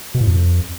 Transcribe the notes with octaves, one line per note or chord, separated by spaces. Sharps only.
B2
A2
F2